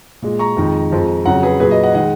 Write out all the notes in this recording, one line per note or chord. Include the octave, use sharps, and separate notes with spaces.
A#2 G#3
A#5 C#6
F2 D#3 G#3
F2 F3 G#3
F2 C#3 F#3 F#5 A#5
G#4 B4
A#2 F#3 G#4 B4
B4 D#5
D#5 F#5
D#3 G#3 D#5 F#5